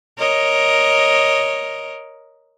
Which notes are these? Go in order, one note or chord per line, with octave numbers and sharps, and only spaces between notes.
A#4 C#5 D#5